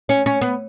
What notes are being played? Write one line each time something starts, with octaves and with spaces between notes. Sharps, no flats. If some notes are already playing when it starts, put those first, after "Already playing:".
C#4
C#4
B3